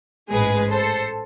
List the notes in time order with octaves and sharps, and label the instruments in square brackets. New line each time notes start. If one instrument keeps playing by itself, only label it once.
[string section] A1 G#2 G#3 G#4 B4
A4 C5